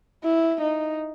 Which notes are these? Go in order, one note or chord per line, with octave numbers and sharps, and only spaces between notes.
E4
D#4